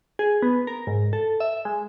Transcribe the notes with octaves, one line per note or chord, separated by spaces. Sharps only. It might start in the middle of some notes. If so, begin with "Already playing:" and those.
G#4
B3
A#4
G#2
A4
E5
G#3